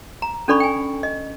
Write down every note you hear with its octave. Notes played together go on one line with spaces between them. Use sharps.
A#5
C#4 D4 A4 D5 B5 C#6
G5 G#5
D#5